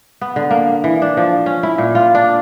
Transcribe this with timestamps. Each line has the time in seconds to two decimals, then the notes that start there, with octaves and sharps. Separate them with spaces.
0.21 B3
0.36 D3
0.50 A#3
0.84 E3
1.02 D4
1.17 F3
1.46 C#4
1.63 E4
1.78 A#2
1.95 F4
2.15 D4